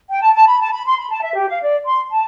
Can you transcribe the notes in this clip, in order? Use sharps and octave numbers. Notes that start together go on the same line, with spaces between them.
G5
A5
A5
B5
A5
B5
C6
B5
A5
E5
G4
F5
D5
C6
A5